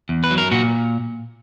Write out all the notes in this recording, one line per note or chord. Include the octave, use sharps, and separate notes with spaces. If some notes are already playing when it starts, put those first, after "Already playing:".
E2
B4
F#3
A#4
A#2 F#4